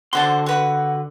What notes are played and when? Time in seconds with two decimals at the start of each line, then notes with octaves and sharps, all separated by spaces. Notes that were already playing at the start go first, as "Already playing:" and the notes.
0.13 D3 F#4 C5 A5 C6
0.46 F#4 B4